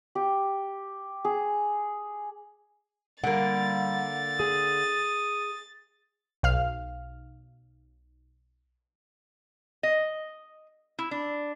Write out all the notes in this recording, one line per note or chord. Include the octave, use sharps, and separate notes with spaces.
G4
G#4
D3 G3 A#3 F#5 A6
G#4 D#6
B1 F5 F6
D#5
E4
D4